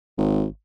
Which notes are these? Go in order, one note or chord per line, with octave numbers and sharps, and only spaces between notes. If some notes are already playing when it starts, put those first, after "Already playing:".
G#1